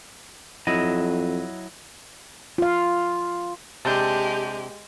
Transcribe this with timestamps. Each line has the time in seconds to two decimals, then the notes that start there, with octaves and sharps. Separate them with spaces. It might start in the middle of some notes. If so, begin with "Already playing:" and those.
0.67 F2 F#3 E4 D#5
2.58 F4 F5
3.85 C3 G#3 D4 G4 A5 G6